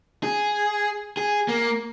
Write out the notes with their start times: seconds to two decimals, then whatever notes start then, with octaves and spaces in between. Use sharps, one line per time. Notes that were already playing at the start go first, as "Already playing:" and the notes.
0.23 G#4
1.17 G#4
1.48 A#3